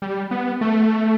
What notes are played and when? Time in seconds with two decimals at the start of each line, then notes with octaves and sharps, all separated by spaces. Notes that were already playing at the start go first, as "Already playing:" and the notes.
0.02 G3
0.31 B3
0.61 A3